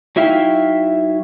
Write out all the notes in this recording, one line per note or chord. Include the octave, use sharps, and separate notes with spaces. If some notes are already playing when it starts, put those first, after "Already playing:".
F#3 D#4 E4 E5 F5 G5